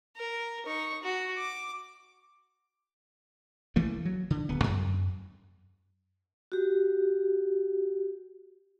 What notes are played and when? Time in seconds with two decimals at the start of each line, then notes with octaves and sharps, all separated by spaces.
0.16 A#4
0.66 D#4 C#6
1.03 F#4
1.38 D6
3.76 E3 A3 A#3
4.05 F#3
4.30 D3
4.49 D1 B3
4.64 F#2
6.52 F#4 G4